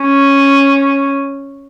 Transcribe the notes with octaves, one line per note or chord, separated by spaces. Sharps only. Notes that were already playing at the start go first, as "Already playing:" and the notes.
Already playing: C#4